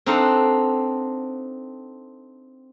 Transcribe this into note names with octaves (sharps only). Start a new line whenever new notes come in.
C4 D4 D#4 A4 F5 F#5